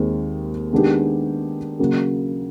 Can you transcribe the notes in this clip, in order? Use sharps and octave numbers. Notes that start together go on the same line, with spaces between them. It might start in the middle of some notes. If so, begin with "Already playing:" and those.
Already playing: D#2 D#3 G#3 C4
D#3 G#3 B3 D4 G4
C#3 F#3 A#3